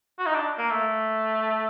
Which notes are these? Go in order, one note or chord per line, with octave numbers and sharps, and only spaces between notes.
F#4
D#4
D4
A#3
A3